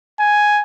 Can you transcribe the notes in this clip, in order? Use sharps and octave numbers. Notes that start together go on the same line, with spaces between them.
G#5